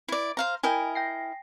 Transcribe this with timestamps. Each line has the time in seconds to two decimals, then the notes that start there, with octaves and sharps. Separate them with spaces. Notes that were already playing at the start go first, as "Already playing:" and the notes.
0.09 E4 D5
0.37 C5 F5 A#5
0.63 E4 A#4 D#5 G5 G#5
0.95 G5 A#6 C7